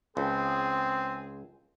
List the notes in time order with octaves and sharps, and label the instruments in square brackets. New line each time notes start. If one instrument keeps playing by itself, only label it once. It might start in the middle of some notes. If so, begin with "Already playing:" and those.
[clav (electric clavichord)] C#2 [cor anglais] C4 [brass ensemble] G#4